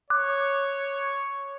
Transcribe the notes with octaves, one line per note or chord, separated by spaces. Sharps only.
C#5 D6 F#6